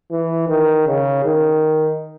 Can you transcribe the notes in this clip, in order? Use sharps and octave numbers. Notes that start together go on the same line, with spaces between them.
E3
D#3
C#3
D#3